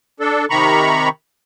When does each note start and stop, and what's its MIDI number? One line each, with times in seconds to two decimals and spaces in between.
0.20 0.45 62
0.20 0.45 69
0.50 1.09 48
0.50 1.09 51
0.50 1.09 82
0.50 1.09 83
0.50 1.09 85